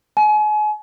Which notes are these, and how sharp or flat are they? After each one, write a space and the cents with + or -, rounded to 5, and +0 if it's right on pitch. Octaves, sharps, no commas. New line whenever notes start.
G#5 +35